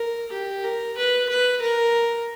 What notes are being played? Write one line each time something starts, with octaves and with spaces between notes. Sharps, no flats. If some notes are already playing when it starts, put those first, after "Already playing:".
Already playing: A#4
G4
A#4
B4
B4
A#4